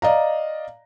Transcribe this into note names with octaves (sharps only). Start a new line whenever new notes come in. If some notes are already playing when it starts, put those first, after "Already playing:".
D5 D#5 F5 A#5